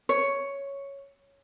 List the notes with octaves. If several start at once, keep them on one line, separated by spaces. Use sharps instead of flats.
C#5